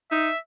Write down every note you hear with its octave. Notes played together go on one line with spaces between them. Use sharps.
D#4 E5